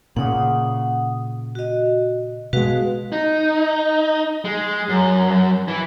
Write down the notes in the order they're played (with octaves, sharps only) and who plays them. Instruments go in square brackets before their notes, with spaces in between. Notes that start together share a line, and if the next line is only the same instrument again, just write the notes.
[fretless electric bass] A#2 C#3 [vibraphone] F#5 D#6
[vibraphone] F#4 D#5
[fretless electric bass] B2 G#3 [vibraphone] F#4 B4 F5
[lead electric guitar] D#4
G#3
F#2
E3